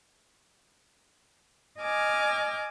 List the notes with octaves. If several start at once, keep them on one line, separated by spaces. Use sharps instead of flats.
D#5 G#5 D6 F6